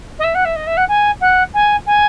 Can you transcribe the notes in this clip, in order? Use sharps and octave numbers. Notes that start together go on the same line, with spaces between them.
D#5
E5
F#5
E5
D#5
E5
F#5
G#5
F#5
G#5
G#5